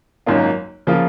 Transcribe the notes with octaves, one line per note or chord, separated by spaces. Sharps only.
G#1 F#2 D#3 A#3 F4
C#3 F3 A#3 F4